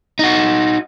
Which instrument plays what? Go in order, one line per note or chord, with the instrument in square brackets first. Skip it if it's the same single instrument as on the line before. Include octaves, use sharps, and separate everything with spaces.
[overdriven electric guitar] D#4 F#4